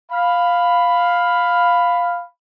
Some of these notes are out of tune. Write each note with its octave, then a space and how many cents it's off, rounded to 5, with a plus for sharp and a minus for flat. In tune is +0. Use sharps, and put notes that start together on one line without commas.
F5 +5 B5 +10